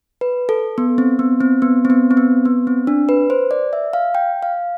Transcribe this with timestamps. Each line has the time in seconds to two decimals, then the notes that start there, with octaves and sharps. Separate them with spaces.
0.21 B4
0.49 A4
0.78 B3
0.98 C4
1.19 B3
1.41 C4
1.62 B3
1.85 C4
1.90 B3
2.11 C4
2.17 B3
2.45 B3
2.67 C4
2.87 D4
3.09 B4
3.30 C5
3.51 D5
3.73 E5
3.93 F5
4.15 G5
4.43 F5